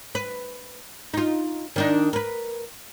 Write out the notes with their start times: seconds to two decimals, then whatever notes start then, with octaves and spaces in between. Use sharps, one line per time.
0.15 B4
1.14 D#4 F4
1.76 D#3 D4 D#4
2.13 A#4 B4